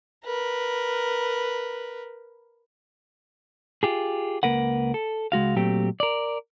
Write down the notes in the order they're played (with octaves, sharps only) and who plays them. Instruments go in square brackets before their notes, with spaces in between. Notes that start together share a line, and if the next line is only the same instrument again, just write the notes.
[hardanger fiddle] A#4 B4
[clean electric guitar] F4 G4 G#4
C#2 A#3 A#4 B4 F#5
A4
C#2 G#3 F#4 F5
A#2 F#3 A3 C4 G4
A#4 D5